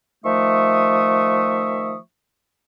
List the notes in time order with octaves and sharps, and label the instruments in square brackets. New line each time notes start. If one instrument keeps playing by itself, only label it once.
[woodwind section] D#3 F3 A3 E5 C#6 D#6